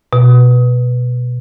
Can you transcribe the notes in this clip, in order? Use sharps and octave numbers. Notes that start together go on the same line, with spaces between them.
B2